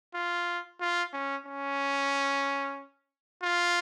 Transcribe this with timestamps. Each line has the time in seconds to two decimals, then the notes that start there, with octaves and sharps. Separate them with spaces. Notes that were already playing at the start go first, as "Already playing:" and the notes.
0.15 F4
0.81 F4
1.13 C#4
1.47 C#4
3.43 F4